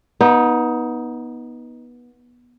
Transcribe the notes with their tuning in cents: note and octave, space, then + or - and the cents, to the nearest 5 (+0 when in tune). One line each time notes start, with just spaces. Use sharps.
B3 -20 D#4 +15